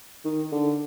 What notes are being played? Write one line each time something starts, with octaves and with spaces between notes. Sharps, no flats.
D#3
D3